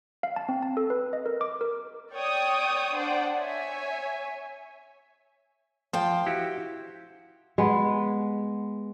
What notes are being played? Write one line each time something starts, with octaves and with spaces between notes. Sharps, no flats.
F5
A5
C4
A5
A4
B4
D#5
A#4
D6
A#4
C#5 D5 G5 C#6 D#6
D4 C5 D5 F#5 G5
C#5 E5 G#5
F3 C5 F5 G5
E4 F#4 G4
G#3 B3